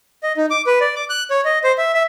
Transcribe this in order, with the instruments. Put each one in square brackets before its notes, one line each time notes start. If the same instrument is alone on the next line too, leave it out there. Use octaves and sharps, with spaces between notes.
[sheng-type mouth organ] D#5
D#4
D6
B4
D5
D6
F#6
C#5
D#5
C5
E5
E5